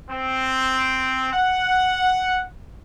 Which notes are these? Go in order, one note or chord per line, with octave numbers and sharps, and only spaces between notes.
C4
F#5